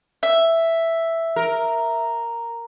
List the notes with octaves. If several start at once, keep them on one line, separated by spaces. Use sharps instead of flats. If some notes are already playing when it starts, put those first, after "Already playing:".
E5
A#4